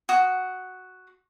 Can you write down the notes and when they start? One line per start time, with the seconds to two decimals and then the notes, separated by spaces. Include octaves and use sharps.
0.09 F#4 D#6